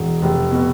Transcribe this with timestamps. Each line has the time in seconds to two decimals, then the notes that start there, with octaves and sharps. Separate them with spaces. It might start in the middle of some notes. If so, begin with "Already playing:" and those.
Already playing: E1
0.22 F1
0.51 B2